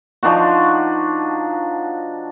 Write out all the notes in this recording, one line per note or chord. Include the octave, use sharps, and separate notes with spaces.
F3 D4 D#4 F#4